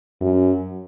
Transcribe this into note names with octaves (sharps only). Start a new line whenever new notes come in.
F#2